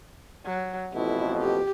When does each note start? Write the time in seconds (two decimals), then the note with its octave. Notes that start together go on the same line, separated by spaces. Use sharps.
0.46 F#3
0.94 A1 F2 B2 E4
1.40 G4